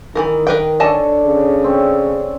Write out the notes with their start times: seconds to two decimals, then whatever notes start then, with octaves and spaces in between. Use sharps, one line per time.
0.15 D#3 E3 A3 A#4
0.47 A#4 B4 G5
0.80 D4 A4 C#5 D#5 G#5 A5
1.25 C#3
1.64 C4 C#4